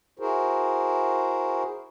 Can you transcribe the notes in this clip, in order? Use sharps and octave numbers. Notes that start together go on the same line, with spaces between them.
E4 F#4 G#4 A#4 C5